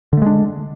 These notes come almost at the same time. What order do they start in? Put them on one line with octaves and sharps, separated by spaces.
D3 A3 G#3 D4